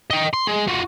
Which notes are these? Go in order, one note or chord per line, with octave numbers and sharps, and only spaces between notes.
D#5 G5
C6
G#3
F4 F#4